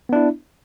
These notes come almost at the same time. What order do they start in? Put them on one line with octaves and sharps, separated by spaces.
B3 D4 E4